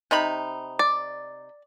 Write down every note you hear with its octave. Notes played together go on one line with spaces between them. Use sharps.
C3 D#4 B5
D5